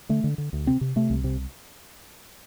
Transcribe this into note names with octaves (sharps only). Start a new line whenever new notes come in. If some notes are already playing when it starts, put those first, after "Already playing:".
D3 A3
D3
D3
D2
C3 C4
C3
C3 A3
C2
C3